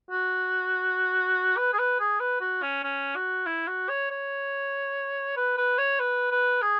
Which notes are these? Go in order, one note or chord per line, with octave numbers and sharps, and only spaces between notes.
F#4
B4
G#4
B4
G#4
B4
F#4
C#4
C#4
F#4
E4
F#4
C#5
C#5
B4
B4
C#5
B4
B4
G#4